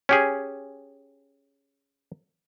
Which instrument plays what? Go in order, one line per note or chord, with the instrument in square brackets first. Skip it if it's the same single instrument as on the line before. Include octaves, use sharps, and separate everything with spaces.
[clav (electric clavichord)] C#4 G4 G#4